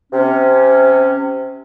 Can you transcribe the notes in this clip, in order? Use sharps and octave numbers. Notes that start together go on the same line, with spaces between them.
C3 C#4